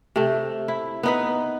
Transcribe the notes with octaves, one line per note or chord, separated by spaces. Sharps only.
C3 A3
E4
B3 D#4 B4